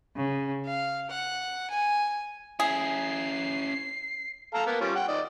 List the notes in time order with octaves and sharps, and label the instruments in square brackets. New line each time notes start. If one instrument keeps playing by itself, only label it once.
[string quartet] C#3
F5
F#5
G#5
[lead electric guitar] C#4 E4 [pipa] G#4 [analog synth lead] C7
[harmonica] A4 F5 A#5
A#3 B3
G3 C#4 F4
F#5 G5
D#3 D5 D#5